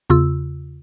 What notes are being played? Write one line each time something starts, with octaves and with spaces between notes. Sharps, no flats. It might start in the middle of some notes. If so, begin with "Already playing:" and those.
E2 C#3 F4 E6